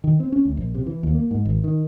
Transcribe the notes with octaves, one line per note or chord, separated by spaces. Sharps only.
D#3
C4
C#4
D2
A#1
C3
E3
D#2
A#3
G#2
G#1
D#3